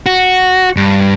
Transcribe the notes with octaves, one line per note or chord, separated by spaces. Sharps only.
F#4
G2